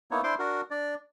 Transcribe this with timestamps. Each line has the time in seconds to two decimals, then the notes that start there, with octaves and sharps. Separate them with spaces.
0.11 A#3 B3 D#4 E4 C#5
0.24 D4 E4 C5 C6 D6
0.39 D4 F#4 A#4
0.71 D4 D5